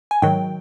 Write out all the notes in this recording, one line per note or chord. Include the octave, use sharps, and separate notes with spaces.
G#5
G#2 D#3 F#3 G5